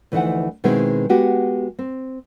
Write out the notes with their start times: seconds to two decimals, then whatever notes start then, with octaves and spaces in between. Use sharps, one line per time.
0.12 D2 E3 F3 D#4 E4 F#5
0.64 B2 D#3 G#3 C4 D#4 E4
1.09 G#3 B3 F#4 G4
1.79 C4